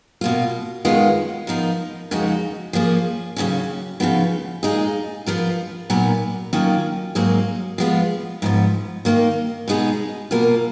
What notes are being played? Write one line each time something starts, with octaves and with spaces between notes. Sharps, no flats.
B2 A#3 F4
F#2 D#3 G#3 B3 F4
F3 B3 D#4 A#4
F2 C#3 G#3 D#4 F#4
F3 A#3 C#4 G#4
D#2 C#3 F#3 C#4
C#3 F3 B3 D#4
A#2 G#3 D#4 G#4
F3 B3 F4 A#4
A#2 F#3 B3 D#4 A#4
D#3 F#3 A#3 C#4 F4
G#2 F#3 A#3 D#4 G#4
F3 G#3 B3 F4
G#2 F3 B3
D#3 A#3 D#4
B2 G#3 B3 D#4 G#4
B2 A#3 F4 A#4